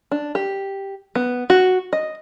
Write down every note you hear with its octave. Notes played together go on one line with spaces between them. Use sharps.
D4
G4
B3
F#4
D#5